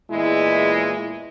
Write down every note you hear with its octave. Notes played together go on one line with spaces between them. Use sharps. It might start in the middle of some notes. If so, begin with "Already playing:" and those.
E2 A#2 G#3 E4